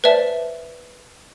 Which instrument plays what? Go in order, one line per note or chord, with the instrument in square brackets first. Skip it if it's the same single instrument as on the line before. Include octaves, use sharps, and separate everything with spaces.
[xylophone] B4 C5 D5 E5 A5